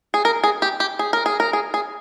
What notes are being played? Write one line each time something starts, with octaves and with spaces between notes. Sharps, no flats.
G#4
A#4
G#4
G4
G4
G#4
A#4
G#4
A#4
G#4
G#4